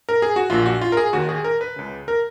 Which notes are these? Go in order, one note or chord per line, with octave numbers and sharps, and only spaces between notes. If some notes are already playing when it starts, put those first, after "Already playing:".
A#4
G#4
F#4
A#1 A#2 F4
F#4
F4
A#4
G#4
D#2 D#3 F#4
G#4
A#4
B4
C#2 C#3
A#4